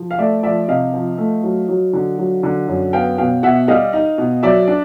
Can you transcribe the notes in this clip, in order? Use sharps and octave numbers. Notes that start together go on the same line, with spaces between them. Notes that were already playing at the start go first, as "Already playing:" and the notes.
Already playing: F3
F5
A3 D5 E5
F3 D5 E5
C3 D#5 F5
F3
A3
F#3
F#3
D3
F#3
D3
F#2
B3 F5 G5
B2 F5 G5
B2 E5 F#5
G3 D#5 F5
D#4
B2
F#3 D5 E5
D4